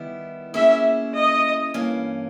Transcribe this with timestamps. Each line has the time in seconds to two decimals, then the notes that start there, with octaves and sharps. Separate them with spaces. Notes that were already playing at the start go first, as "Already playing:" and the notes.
Already playing: D#3 G3 B3 E4
0.54 A#3 C#4 E4 G#4 E5
1.15 D#5
1.74 G2 E3 A#3 C#4